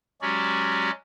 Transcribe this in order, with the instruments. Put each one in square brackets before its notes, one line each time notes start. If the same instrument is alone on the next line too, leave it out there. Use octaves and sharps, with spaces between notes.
[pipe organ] F#3 G#3 C#4 F#4 G4 D5